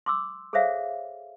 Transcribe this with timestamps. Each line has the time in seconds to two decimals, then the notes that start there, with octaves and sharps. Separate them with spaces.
0.06 C6 D6 E6
0.53 G#4 A4 C5 C#5 E5 F5